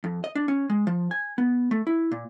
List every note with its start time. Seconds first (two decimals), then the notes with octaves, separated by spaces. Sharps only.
0.04 F2
0.24 D#5
0.35 D4
0.48 C#4
0.70 G#3
0.87 F3
1.11 G#5
1.38 B3
1.71 A3
1.87 E4
2.12 A#2